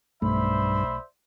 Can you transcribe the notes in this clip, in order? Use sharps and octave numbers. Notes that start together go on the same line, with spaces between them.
B1 G2 A3 C5 D5 E5 B5